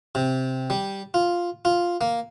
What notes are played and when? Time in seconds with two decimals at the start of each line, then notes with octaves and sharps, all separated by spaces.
0.15 C3
0.70 G3
1.14 F4
1.65 F4
2.01 A#3